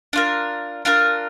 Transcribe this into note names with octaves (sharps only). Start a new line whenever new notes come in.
D4 F4 A#4
D4 F4 A#4